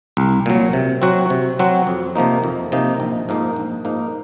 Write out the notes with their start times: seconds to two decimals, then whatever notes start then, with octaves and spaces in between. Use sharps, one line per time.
0.17 C2
0.46 A#2 F#3
0.73 C3
1.02 F#3 C4 F#4
1.30 C3
1.59 F#3 C4 F#4
1.87 F2
2.15 C3 F3 A#3 D#4
2.44 F2
2.72 C3 F3 A#3 D#4
3.00 A#1
3.29 G#2 F3 A#3 D#4
3.56 A#1
3.85 G#2 F3 A#3 D#4